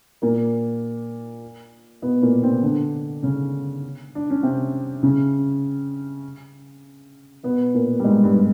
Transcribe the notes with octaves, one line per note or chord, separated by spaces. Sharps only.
A#2 A#3
B2 B3
A#2 A#3
C3 C4
D3 D4
C#3 C#4
D4
C#4
C3 C4
C#3 C#4
B2 B3
A#2 A#3
G3
G#2 G#3
G2 G3